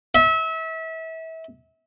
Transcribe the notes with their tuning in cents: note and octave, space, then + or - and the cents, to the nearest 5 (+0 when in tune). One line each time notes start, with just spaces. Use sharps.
E5 -30